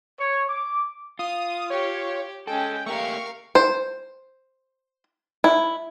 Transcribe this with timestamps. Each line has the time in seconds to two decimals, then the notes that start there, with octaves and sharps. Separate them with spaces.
0.19 C#5
0.50 D6
1.19 F4 D#6
1.70 G4 C#5
2.47 G#3 C#4 A4 G5
2.86 A3 A#3 G4 A#4 F5 C#6
3.55 C5
5.44 E4